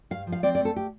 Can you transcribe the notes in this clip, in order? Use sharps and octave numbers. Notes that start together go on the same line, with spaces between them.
G2 F5
F3
F5
C4 D5
D5
A3
A4
G4